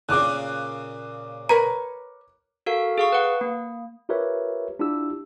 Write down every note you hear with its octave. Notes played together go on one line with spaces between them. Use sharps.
A#2 C#3 D6 F#6
A#4 B4 C#5 A#5
F#4 A4 A#4 F5
G#4 F5 C#6
B4 F#5
A#3
F4 G4 A#4 B4 C#5 E5
D4 E4 F4 G4 E6